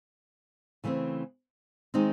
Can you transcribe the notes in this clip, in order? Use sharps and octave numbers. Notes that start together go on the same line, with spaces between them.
C#3 E3 A3 C4
D#3 G#3 C4 D#4